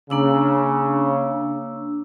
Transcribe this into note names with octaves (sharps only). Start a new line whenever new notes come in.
C#3 A#3 D4 E6